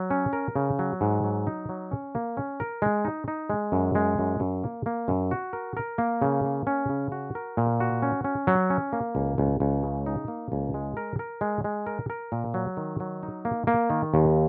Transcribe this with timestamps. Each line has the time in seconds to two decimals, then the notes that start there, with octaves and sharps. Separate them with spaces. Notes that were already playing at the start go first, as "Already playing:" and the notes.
Already playing: F#3
0.10 C#4
0.33 A#4
0.56 C#3
0.79 F#3
1.01 G#2
1.24 F#3
1.47 D#4
1.69 F#3
1.91 C#4
2.15 A#3
2.37 C#4
2.60 A#4
2.82 G#3
3.05 D#4
3.28 D#4
3.50 G#3
3.72 F#2
3.95 G#3
4.19 F#2
4.40 F#2
4.64 A#3
4.86 A#3
5.08 F#2
5.31 F#4
5.53 A#4
5.77 A#4
5.98 A#3
6.22 C#3
6.45 A#3
6.67 C#4
6.89 C#3
7.12 F#4
7.35 A#4
7.57 A#2
7.80 F#4
8.02 C#4
8.24 C#4
8.47 F#3
8.70 C#4
8.93 A#3
9.15 C#2
9.38 C#2
9.60 C#2
9.83 C#3
10.06 D#4
10.28 A#3
10.52 C#2
10.74 G#3
10.97 A#4
11.19 A#4
11.41 G#3
11.64 G#3
11.87 A#4
12.10 A#4
12.32 A#2
12.54 F#3
12.77 D#3
13.00 F#3
13.23 D#4
13.45 A#3
13.67 A#3
13.90 D#3
14.14 D#2